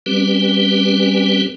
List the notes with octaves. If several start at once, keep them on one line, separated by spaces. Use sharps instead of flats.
G3 C4 C#4 G4 B4